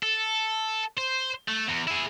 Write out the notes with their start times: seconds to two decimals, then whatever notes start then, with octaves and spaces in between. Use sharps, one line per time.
0.03 A4
0.97 C5
1.48 A3
1.69 E2
1.88 E4 G#4